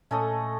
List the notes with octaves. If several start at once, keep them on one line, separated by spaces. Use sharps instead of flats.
A#2 A3 C#4 A4 D#5